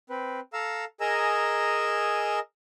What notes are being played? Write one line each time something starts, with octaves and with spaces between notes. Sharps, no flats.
C4 B4
A4 F5 A#5 E6
G#4 A#4 D#5 G#5 A#5 E6